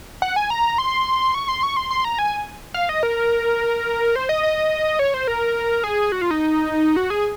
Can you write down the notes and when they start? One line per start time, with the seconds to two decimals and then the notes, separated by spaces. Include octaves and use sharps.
0.22 F#5
0.36 G#5
0.50 A#5
0.78 C6
1.34 C#6
1.48 C6
1.63 C#6
1.77 C6
1.91 C6
2.05 A#5
2.19 G#5
2.74 F5
2.89 D#5
3.03 A#4
4.16 C5
4.29 D#5
4.43 D#5
4.99 C#5
5.14 C5
5.27 A#4
5.84 G#4
6.12 F#4
6.21 F4
6.31 D#4
6.96 F#4
7.10 G#4